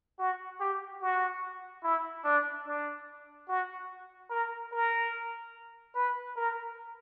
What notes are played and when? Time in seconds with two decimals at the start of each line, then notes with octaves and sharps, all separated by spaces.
0.19 F#4
0.60 G4
1.01 F#4
1.83 E4
2.24 D4
2.66 D4
3.48 F#4
4.30 A#4
4.72 A#4
5.95 B4
6.36 A#4